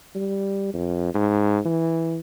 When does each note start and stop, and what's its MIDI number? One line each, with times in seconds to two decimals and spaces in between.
0.15 0.69 55
0.74 1.13 41
1.14 1.59 44
1.65 2.19 52